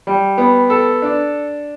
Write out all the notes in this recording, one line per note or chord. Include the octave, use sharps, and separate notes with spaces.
G3
B3
A4
D4